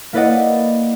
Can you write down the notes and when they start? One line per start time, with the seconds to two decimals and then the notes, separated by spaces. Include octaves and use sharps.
0.13 A#3 E4 B4 D5 D#5 F#5